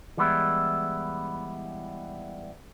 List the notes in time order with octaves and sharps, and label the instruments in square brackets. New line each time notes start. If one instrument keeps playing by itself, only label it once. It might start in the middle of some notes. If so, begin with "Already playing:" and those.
[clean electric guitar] E3 G3 G#3 B3 E4